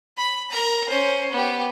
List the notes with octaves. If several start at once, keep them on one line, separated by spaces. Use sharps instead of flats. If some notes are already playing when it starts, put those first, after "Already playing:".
B5
A#4 A#5
C#4 C5
B3 G4